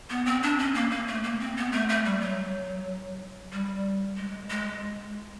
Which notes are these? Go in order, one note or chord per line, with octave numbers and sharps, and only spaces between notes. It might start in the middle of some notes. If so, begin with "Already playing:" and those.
B3
C4
D4
C#4
A#3
A#3
A3
A#3
C4
B3
A3
A3
G3
F#3
G3
G#3
G#3